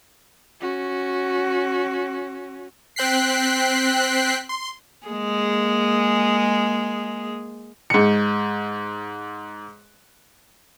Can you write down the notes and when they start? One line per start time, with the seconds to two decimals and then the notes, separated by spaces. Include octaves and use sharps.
0.61 C#4 F#4
2.96 C4 G5 F#6 B6 C7
4.49 C6
5.06 G#3 A#3 G#4
7.90 G#2 C#7